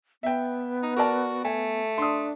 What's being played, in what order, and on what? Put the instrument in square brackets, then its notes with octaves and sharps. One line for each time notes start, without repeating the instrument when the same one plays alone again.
[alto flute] B3 [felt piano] E5 G5
[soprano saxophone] D#4
[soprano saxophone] F#4 [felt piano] A#4 D5 A5
[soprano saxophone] A3 [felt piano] G#5
[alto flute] D4 [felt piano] C6 D#6